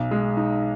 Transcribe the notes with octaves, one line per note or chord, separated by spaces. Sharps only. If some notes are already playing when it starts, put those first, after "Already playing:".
Already playing: B1
G#3
D#4